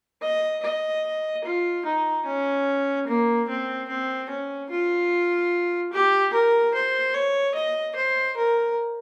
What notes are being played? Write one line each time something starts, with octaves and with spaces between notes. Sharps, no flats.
D#5
D#5
F4
D#4
C#4
A#3
C4
C4
C#4
F4
G4
A#4
C5
C#5
D#5
C5
A#4